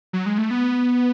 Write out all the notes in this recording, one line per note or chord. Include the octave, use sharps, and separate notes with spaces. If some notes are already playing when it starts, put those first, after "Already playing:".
F#3
G#3
A3
B3